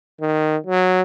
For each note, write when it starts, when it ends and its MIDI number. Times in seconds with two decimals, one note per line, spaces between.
0.21 0.57 51
0.66 1.02 54